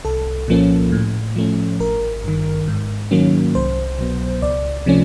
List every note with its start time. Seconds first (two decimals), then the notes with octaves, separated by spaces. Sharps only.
0.05 C2 A4
0.48 A#2 F3 A#3 C#4
0.92 A2
1.36 F3 A3 C#4
1.80 G#1 A#4
2.24 G2 D#3
2.68 G#2
3.11 D#3 F#3 A#3 C#4
3.55 C2 C5
3.98 B2 F#3 B3
4.42 C#2 D5
4.86 C3 F3 A3 C#4